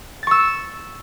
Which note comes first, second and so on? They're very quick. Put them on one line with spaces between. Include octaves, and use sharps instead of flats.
A6 C#6 E6